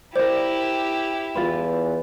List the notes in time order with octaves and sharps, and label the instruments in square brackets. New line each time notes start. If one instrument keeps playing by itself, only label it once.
[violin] E4 G4 [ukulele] A#4 D5 [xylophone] C5
[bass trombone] E2 [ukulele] F4 B4